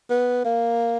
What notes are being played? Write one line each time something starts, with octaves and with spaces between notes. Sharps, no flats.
B3
A#3